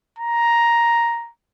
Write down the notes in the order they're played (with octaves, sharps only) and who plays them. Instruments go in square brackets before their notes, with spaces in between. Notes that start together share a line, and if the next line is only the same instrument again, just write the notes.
[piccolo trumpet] A#5